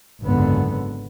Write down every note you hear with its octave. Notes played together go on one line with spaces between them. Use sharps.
G#1 C#2 F#2 D3 B3